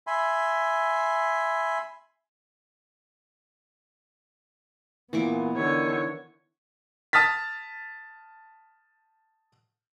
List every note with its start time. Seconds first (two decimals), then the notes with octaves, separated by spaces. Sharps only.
0.07 E5 G#5 B5 C6
5.13 A#2 E3 B3 C#6 D6
5.56 D3 D#3 C#5
7.13 A5 D#6 F6 A6 B6